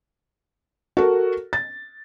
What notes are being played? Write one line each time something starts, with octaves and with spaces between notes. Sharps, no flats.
F#4 A4 A#4
A6